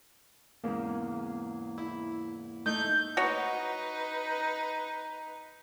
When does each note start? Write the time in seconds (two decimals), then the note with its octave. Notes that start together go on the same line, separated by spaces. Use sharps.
0.64 E2 G#2 C#3 A#3
1.78 E4
2.66 A3 D#4 G6
3.17 D#4 F#4 B4 C#5 D#5